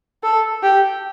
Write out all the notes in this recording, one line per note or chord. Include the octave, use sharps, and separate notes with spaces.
A4
G4